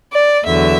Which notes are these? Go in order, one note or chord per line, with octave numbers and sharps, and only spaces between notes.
D5
E2 D3 F#3 E5